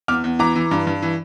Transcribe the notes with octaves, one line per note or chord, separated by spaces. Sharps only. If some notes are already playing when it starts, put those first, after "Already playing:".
E2 D6 F6
E2
E3 A#5 D6
E3
G2
G2
E3